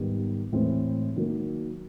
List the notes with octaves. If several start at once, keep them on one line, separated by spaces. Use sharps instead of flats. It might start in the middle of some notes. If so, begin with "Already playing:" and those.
Already playing: G#2 D#3 G3 B3
A2 E3 G#3 C4
D#3 F#3 A#3